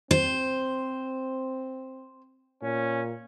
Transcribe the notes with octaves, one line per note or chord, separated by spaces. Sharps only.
C4 C5
A#2 C#4